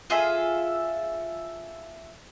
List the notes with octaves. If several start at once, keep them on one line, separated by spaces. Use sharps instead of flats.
F4 G#4 A4 E5